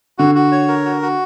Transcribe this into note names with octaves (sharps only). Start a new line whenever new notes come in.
D3 F#4
F#4
C#5
A#4
F#4
F#4